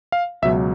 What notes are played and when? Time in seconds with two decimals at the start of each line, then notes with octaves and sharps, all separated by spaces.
0.12 F5
0.42 C#2 B2 F#3 E5